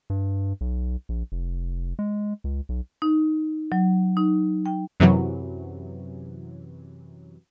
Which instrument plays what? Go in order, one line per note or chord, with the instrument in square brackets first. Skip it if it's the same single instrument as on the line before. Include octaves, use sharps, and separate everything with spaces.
[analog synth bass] G2
B1
A#1
F1
G#3
C#2
B1
[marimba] D#4
F#3
D#4
G5
[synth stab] F#2 C3 E3 F#3